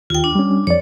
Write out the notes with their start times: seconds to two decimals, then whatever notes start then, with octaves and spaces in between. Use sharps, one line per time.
0.10 D#2 F4 G5
0.24 D4
0.35 G3 C#4
0.67 F2 C#5 D5